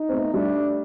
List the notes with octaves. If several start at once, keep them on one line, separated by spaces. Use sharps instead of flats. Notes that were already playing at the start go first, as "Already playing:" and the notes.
Already playing: D#4
C4
A3 B3
G3 A3 D4